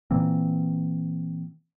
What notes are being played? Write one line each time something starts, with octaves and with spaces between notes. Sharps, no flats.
A#2 E3 A#3 C4